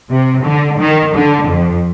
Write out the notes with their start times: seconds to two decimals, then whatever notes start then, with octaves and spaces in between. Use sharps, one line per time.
0.10 C3
0.45 D3
0.79 D#3
1.15 D3
1.49 F2